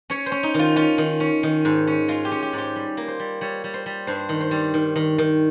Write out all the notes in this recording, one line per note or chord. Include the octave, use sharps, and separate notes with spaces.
C#4 C#5
C5
C#4
D#4
D#3 F4
C#4 F4
D#3
C#4
D#3
G#2
C#4
G#3 F4
G4
C#4
G4
G#2
G4
G3
A#3
C5
G3
G3 C#5
G3
C5
G3
G2 C5
D#3
C5
G3
D#3
D#3
D#3